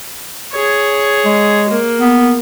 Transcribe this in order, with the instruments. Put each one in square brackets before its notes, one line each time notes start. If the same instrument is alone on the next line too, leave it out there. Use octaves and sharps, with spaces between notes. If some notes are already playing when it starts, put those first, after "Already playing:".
[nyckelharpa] G#4 C#5
[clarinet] G#3
[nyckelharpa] A#3
[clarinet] B3